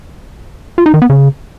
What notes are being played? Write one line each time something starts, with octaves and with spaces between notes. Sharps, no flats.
F4
D#4
D#3
B3
C#3